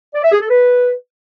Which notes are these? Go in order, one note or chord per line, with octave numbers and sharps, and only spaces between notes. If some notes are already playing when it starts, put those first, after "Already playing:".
D5
E5
G#4
A4
B4